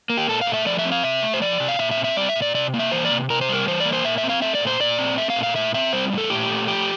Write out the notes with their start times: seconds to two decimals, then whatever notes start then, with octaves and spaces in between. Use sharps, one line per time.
0.10 A#3
0.18 G4
0.28 A#2 A4
0.41 F5
0.47 A3
0.54 E5
0.66 F3 D5
0.79 E5
0.85 C4
0.92 F5
1.04 C3 E5
1.23 A3
1.34 C5
1.41 F3 D5
1.60 C3
1.68 F5
1.79 A#2 E5
1.91 E5
1.97 C4
2.04 E5
2.16 G3 D5
2.29 E5
2.36 A#2
2.42 D5
2.54 C3 D5
2.74 A#3
2.79 E5
2.92 E3 C5
3.05 D5
3.11 C3
3.30 C3 A#4
3.41 C5
3.49 G3 A#4
3.67 E3 C5
3.80 D5
3.85 A#3
3.93 C5
4.05 A#2 E5
4.18 E5
4.23 C4
4.29 F5
4.42 A3 E5
4.55 D5
4.61 A#2
4.67 C5
4.80 A#2 D5
4.99 C4
5.18 A3 E5
5.30 F5
5.36 A#2
5.43 F5
5.55 A2 E5
5.74 C4 E5
5.93 G3 C5
6.12 A2
6.18 A4
6.30 A#2 G4
6.50 A3
6.68 F3 G4